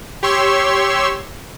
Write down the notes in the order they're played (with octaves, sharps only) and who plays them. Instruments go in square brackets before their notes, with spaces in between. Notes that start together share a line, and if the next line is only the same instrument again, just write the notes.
[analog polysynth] G4 C#5 C6 C#6 E6